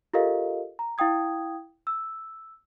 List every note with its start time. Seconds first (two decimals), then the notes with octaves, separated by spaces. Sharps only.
0.14 F4 G4 A4 A#4 D#5 F5
0.79 A#5
0.98 E4 F5 G5 D#6 G#6
1.87 E6